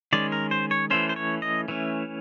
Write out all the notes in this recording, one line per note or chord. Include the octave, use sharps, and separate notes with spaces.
D#3 G#3 C#4 D5
A#4
C5
C#5
E3 A3 C#4 C5
C5
C#5
D#5
E3 A3 C#4